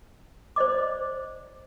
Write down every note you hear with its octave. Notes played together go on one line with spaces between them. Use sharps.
C5 D5 D#5 D6